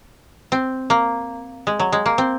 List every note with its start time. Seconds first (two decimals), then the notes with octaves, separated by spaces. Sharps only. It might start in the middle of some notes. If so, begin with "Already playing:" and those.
0.52 C4
0.90 A#3
1.67 G#3
1.80 F#3
1.92 G#3
2.06 A#3
2.18 C4